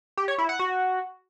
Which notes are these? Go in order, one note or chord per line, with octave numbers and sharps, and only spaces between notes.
G4
C#5
E4
F#5
F#4